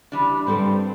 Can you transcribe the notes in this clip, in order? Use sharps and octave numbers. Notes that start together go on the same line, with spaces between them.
E3 G3 D4
G2 G3 C4 A4